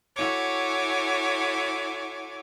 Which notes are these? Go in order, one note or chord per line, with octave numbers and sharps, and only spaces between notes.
E4 F#4 A4 C#5 G#5 D6